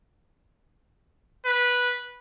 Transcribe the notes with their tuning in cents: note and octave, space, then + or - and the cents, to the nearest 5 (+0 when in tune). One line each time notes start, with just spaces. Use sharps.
B4 -10